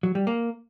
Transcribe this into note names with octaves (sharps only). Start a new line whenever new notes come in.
F#3
G3
A#3